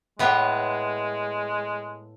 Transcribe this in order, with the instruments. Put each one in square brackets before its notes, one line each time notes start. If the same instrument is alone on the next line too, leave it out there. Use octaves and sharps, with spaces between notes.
[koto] A2 B3 C#5 [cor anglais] G#3